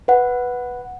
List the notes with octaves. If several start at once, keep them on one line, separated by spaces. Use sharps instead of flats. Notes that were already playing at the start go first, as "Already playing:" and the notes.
B4 F#5